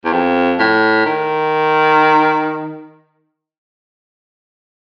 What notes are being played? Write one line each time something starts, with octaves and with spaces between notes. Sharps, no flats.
E2
F2
A2
D#3